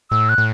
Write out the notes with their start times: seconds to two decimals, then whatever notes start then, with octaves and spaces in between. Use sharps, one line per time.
0.11 A2 E6
0.29 F#6
0.38 A2